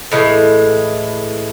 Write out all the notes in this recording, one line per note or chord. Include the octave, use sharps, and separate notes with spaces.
A2 E3 G#3